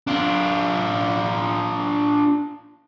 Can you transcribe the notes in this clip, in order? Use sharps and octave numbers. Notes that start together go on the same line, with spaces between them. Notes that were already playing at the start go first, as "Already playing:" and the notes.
D4 F4